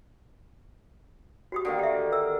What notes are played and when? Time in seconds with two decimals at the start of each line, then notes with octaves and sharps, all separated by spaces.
1.52 F#4 G4 D#6
1.65 D3 D#3 A#3
1.79 G4 E5
2.12 A#4 E6